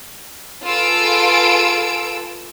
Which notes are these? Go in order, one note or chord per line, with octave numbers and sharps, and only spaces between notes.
F4 G#4 A4 B4 E6 D7